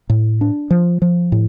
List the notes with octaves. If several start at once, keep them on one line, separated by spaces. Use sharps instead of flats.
A2
D4
F3
F3
A2